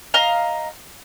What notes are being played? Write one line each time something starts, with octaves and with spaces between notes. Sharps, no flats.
D#5 F5 A#5